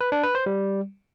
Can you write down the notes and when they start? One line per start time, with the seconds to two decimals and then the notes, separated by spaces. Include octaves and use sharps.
0.01 B4
0.12 D4
0.23 B4
0.35 C5
0.46 G3